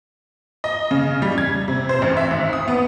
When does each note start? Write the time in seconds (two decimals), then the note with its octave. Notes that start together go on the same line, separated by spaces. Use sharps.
0.64 D#5
0.91 C#3
1.22 G3
1.38 G#6
1.68 C3
1.89 C5
2.02 A1
2.17 E5
2.31 G#1
2.53 D#6
2.68 B3